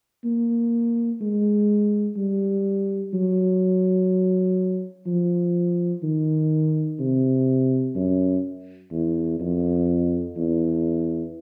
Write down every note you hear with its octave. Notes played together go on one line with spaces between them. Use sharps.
A#3
G#3
G3
F#3
F3
D#3
C3
F#2
E2
F2
E2